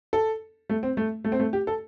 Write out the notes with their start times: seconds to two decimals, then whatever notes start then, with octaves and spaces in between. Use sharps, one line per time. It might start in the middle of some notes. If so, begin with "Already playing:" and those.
0.13 A4
0.69 A3
0.83 C4
0.97 A3
1.24 A3
1.32 C4
1.40 A3
1.53 G4
1.67 A4